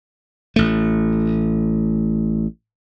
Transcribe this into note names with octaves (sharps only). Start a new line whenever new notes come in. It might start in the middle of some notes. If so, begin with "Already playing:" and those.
A1 A3